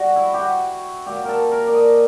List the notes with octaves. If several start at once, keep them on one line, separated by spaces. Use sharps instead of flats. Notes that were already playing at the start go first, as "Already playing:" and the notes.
Already playing: G3 B3 F#4
E4
G4
F#4
A#2 F#3 A#3 G4
A4 A#4
A#4
D5
D#5